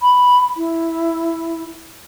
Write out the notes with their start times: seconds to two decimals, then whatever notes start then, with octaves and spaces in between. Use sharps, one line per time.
0.02 B5
0.57 E4